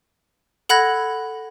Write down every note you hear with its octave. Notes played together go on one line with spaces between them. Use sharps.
A4 F#5 B5 F#6 G#6 A#6